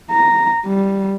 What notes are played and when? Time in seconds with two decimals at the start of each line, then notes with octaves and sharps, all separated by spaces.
0.11 A#5
0.66 G3